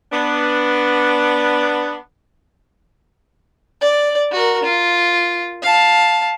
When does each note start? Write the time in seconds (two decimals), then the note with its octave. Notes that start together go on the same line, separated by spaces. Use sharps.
0.12 B3 D4
3.81 D5
4.32 F#4 A#4
4.63 F4
5.62 F5 A5